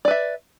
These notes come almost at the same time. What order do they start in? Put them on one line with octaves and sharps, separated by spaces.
D5 B4 E5